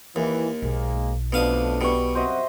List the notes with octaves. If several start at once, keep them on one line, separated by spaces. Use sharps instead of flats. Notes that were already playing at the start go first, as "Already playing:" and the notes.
D#2 E3
B1 G#2 G#3 A#3
F2 B2 A3 D4 F5 D#6
B2 G3 C#6
F#2 C4 F#4 C5 D#5 E5